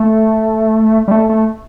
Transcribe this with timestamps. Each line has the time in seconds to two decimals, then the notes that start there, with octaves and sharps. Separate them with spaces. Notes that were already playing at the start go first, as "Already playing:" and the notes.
Already playing: A3
1.08 G3
1.11 A3
1.29 A3